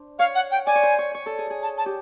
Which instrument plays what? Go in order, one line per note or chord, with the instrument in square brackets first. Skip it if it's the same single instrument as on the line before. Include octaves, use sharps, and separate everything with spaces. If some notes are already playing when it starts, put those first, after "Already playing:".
Already playing: [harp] D4 C5
[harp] C#5 [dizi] F5
[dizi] F#5
G5
[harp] D5 [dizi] G#5
[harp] C#5
C5
C#5
C#5
A4
G#4
G#4
[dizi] A5
A5
[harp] G4